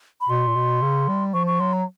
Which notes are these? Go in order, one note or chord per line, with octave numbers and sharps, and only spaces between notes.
B5
B2 C6
A#2
B2
C#3
G3
F3 C#6
C#6
F#3 C6
A#5